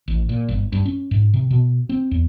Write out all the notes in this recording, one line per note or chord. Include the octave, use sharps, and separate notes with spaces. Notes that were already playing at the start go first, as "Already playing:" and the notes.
A1
A#2
G1
G2
C#4
G#2
C3
B2
C4
E2